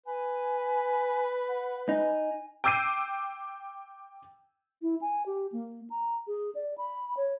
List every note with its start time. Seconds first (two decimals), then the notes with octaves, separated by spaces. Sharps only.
0.06 B4 G#5
1.49 F#5
1.89 D#4 G#5
2.64 G5 D6 E6 G6 C7 D#7
4.82 E4
5.01 G#5
5.26 G4
5.52 A#3
5.90 A#5
6.27 G#4
6.55 D5
6.78 B5
7.17 C#5